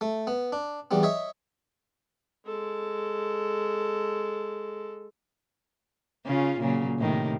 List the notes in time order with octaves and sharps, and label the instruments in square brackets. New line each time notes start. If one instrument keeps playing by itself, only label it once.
[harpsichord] A3
B3
D4
E2 G3 B3
C#5 D#5 E5
[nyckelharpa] G#3 A4
[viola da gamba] C#3 C#4 F4
A#2 C#3 F#3
A2 C3 D#3